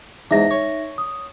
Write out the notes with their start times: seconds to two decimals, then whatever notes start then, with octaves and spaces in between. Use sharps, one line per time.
0.31 E2 G#2 D#4 E5 A#6
0.51 C#5
0.98 D#6